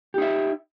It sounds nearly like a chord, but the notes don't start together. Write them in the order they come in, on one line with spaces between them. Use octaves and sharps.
G4 D#4 E5